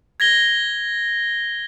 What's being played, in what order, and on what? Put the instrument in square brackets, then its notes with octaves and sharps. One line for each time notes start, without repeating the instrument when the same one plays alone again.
[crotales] G#6 A#6 G7